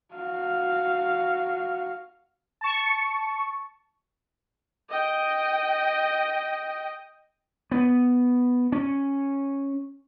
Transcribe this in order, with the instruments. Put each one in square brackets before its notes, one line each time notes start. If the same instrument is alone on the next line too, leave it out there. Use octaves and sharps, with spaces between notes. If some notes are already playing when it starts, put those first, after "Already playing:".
[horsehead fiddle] F#4 F5
[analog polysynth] A5 C#6
[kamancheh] D#5 G5
[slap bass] B3
C#4